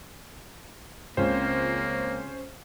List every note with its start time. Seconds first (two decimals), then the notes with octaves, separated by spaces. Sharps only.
1.17 C#2 C#3 A#3 C4 C#4 F4 C5